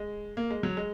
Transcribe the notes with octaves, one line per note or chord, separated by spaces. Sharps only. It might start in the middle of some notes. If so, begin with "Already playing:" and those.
Already playing: G#3
A#3
G#3
F#3
G#3